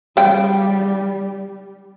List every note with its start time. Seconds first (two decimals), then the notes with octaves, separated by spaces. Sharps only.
0.17 C#3 G3 G5